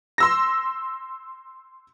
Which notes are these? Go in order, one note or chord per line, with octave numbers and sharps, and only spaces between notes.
C6 E6 A#6